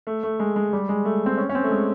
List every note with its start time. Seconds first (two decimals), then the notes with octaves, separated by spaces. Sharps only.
0.07 A3
0.23 A3
0.40 G#3
0.56 G#3
0.73 G3
0.89 G#3
1.05 A3
1.26 C4
1.38 C#4
1.49 C#4
1.55 C4
1.64 A3
1.71 G#3